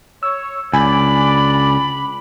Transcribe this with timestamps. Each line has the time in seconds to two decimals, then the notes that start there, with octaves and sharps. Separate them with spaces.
0.23 C#5 E6
0.73 C#2 D4 D5 G#5 B5